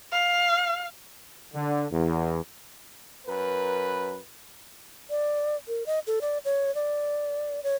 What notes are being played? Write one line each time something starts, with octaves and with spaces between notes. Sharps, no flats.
F5
D3
E2
F#2 A#4 B4
D5
A#4
D#5
A4
D5
C#5
D5
C#5